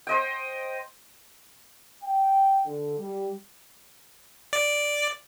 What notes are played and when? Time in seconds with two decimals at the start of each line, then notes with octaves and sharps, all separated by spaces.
0.07 C5 D#5 G5
2.03 G5
2.65 D3
2.99 G3
4.53 D5